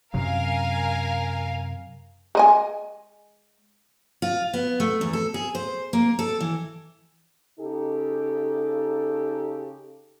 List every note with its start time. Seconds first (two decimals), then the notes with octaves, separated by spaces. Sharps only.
0.14 F#2 C3 F#3 A#4 F5 G#5
2.35 G#3 D#5 G#5
4.22 F4
4.54 B3
4.80 A3
5.01 E2
5.13 A4
5.34 G#4
5.55 C5
5.93 A#3
6.19 A4
6.41 E3
7.59 C#3 D#4 G4 A4